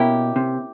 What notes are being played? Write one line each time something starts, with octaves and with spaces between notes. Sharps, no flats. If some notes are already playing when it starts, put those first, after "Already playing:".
Already playing: B2 A#3 C#4 E4 G4
C3